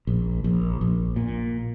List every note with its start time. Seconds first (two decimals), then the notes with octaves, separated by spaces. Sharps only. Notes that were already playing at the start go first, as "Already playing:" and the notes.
0.07 A#1
0.44 A#1
0.81 A#1
1.16 A#2